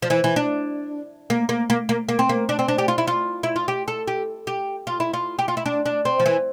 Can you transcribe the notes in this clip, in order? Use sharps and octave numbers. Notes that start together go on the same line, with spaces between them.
F3
E3
E3
D4
A#3
A#3
A#3
A#3
A#3
C4
A#3
D4
C4
D4
G4
F4
E4
F4
E4
F4
G4
A4
G4
G4
F4
E4
F4
G4
F4
E4
D4
D4
C4
F3
E3